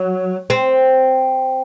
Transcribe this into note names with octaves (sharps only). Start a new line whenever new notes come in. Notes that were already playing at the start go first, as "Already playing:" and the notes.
Already playing: F#3
C4